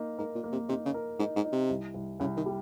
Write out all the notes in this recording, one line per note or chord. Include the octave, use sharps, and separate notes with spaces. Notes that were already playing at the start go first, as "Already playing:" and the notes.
Already playing: A#3 D#4
G#2 A#4
A#2
A#3
C3
C3 D#4
C#3
A#4
G#2 D#4
G#2
D#4
C3
C2
C2
C2 C#3
D#3
G3